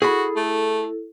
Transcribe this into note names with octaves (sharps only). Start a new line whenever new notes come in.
E4 F#4 G#4 A4 B5
A3